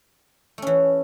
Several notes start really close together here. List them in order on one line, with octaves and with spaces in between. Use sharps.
A3 C#4 E3